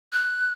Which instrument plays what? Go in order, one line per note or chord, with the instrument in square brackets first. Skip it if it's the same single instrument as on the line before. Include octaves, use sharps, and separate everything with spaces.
[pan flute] F#6